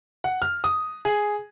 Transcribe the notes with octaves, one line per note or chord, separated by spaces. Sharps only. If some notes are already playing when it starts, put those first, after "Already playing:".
F#5
F6
D#6
G#4